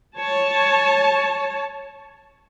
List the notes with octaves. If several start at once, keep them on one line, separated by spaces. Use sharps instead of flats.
C#5 A5